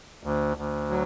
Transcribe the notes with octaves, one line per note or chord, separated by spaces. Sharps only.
D2
D2
F#3